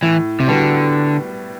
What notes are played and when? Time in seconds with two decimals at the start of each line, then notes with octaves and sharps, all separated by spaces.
0.03 A2 E3
0.40 C3
0.47 D3 G3 B3 F#4